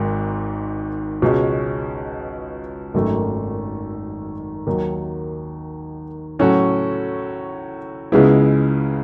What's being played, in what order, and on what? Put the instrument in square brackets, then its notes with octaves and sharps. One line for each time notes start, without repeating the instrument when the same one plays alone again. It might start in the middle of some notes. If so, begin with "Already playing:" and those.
Already playing: [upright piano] G#1 G#2 D#3
C#2 B2 G#3 C#4
G#1 F#2 D#3 A3
D#2 D#3 F#3
A2 F#3 C#4 F#4 A4
C#2 C#3 G#3 B3 E4